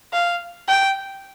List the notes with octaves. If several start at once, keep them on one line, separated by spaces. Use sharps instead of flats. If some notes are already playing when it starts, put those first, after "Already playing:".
F5
G5